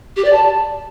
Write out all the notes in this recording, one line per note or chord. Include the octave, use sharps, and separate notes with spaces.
G4
D5
A5